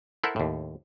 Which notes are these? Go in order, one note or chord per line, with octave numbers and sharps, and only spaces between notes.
E4 A4 A#4 C5 E5 F#5
D#2 A2